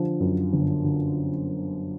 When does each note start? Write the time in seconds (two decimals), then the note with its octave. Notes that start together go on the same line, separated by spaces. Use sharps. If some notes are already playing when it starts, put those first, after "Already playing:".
Already playing: D3 F3
0.20 F#2
0.53 G1
0.84 D3